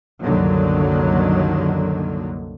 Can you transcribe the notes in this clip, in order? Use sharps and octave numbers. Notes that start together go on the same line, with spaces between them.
C2 F#2 D3 D#3 F#3 A#3